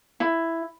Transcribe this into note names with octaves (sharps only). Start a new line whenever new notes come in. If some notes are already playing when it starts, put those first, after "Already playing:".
E4